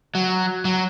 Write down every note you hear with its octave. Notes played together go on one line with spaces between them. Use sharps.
F#3
F#3